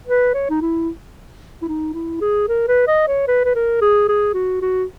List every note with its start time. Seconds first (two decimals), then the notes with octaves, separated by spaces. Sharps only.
0.08 B4
0.34 C#5
0.50 D#4
0.62 E4
1.62 E4
1.68 D#4
1.94 E4
2.21 G#4
2.48 A#4
2.68 B4
2.87 D#5
3.08 C#5
3.28 B4
3.45 B4
3.55 A#4
3.81 G#4
4.08 G#4
4.34 F#4
4.62 F#4